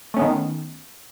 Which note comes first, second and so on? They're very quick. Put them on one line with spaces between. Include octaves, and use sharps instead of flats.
A3 C#4 B3 D#3